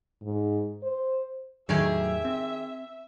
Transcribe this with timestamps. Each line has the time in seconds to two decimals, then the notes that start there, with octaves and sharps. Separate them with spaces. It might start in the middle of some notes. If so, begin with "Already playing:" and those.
0.23 G#2
0.83 C5
1.69 E2 A2 D#3 F#3 G4 G#4 E5
2.25 C4